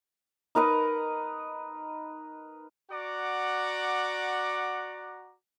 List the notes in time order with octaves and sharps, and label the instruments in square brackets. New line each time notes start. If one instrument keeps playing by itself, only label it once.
[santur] D#4 A#4 B4 D#5
[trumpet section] F#4 D5 F#5 A#5 D6